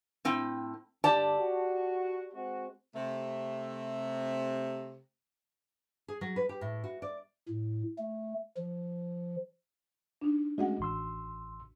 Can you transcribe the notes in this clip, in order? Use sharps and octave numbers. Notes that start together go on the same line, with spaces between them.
A2 C4 G5
G2 D3 G4 D5 A5
F#4
G#3 C4 F#4
C3 A3
G#4
F#3
B4
G4
A2
F#4
D5
A2
A3
F3
D4 D#4
G#3 A3 C#4 F#4 D#5 F#5
A1 C6 E6